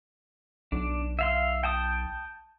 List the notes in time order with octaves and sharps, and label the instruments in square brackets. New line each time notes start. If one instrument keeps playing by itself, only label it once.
[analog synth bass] B1 [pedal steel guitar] D4
[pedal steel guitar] E5 F5 C6
G5 A5 D#6